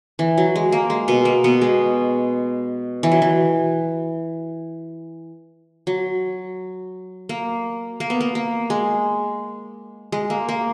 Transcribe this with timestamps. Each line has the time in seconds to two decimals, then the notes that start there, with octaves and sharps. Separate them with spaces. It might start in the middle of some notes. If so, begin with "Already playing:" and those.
0.19 E3
0.38 F#3
0.55 G#3
0.72 A#3
0.90 G#3
1.08 B2 B3
1.25 A#3
1.44 B2 B3
1.61 G#3
3.03 E3
3.12 F#3
3.22 E3
5.87 F#3
7.29 A#3
8.00 A#3
8.10 B3
8.21 A#3
8.35 A#3
8.70 G#3
10.12 G#3
10.30 A#3
10.49 A#3